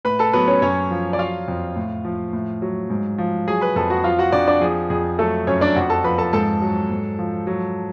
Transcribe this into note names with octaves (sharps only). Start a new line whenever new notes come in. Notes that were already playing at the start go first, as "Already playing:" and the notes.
A2 B4 B5
A4 A5
F#3 B3 B4
C#4 C#5
F#2 C#4 C#5
F3
D5
F#3 F4 F5
F2
A2
F3
A2
F#3
G#2
F3
F#3 G#4 G#5
B4 B5
F2 A4 A5
F#4 F#5
F3 F4 F5
F#4 F#5
F2 D4 D5
D4 D5
F3 G#4
F2 G#4
F#3 A3 A4
F#2 C#4 C#5
D4 D5
F2 F#4 F#5
A4 A5
F3 B4 B5
A4 A5
G#2 A4 A5
F#3
G#2
F3
F#3